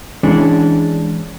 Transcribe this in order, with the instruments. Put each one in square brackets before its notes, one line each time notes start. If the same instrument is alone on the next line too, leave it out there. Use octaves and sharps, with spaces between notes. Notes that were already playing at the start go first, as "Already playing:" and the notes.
[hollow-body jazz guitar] E3 G#3 C#4 D4